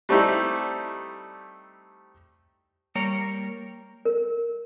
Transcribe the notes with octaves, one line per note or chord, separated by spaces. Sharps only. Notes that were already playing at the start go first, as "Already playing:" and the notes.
G3 A3 C4 D#4 E4 G4
G3 A#3 A#4 C#5
A#4